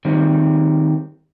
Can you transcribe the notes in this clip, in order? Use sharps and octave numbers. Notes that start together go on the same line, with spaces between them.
D#3 G3 C4